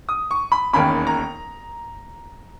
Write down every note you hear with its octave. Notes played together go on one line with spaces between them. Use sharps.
D#6
C#6
B5
E1 D#2 D#3 A#3 C#4 B5
A#5